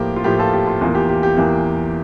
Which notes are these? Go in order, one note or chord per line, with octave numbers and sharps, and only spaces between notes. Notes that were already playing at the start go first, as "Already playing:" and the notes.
Already playing: A2 F3 A#3 G4
F4
A2 F3 A#3 G4
F4 A4
G4
F4
E2 E3 A#3 F4
G4
G4
G4
E2 E3 A#3